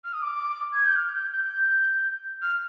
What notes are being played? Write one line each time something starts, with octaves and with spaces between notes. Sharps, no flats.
F6
D#6
D6
G#6
G6
F6
G6
G6
F6